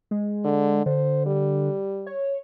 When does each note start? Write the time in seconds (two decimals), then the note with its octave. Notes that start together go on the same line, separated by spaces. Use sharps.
0.11 G#3
0.45 D3
0.86 D3 C5
1.26 G3
2.06 C#5